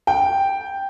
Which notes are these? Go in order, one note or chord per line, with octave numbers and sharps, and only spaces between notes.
G5